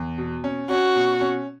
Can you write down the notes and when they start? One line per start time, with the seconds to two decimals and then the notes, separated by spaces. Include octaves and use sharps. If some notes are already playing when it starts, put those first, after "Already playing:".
Already playing: E2
0.18 B2
0.44 C#4
0.70 C#4 F#4
0.96 B2
1.21 C#4